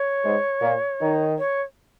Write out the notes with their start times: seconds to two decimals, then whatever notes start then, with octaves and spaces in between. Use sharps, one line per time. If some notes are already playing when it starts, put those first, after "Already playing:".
Already playing: C#5
0.24 G#2 G#3
0.61 A#2 A#3
1.00 D#3 D#4
1.38 C#5